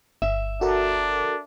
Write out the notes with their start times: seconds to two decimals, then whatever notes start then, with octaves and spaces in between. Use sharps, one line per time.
0.22 G1 E5
0.61 D4 F#4 A4 A#4